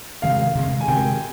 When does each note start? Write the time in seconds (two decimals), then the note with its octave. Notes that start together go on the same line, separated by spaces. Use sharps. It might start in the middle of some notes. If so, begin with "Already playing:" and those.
0.22 C3 D#3 G#3 F5
0.55 C3 D#3 G#3
0.80 G#5
0.88 C3 D#3 G#3 G5